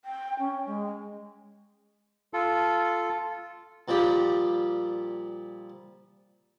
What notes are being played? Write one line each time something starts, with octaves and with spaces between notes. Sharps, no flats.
G5
C#4
G#3
F4 A4
A#2 F3 G3 G4